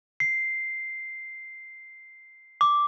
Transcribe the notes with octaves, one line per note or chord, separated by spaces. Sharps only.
C7
D6